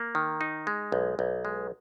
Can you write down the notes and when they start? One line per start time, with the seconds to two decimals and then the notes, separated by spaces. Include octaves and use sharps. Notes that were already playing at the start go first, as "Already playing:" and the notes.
Already playing: A#3
0.15 D#3
0.41 D#4
0.67 G#3
0.92 B1
1.19 B1
1.45 G#3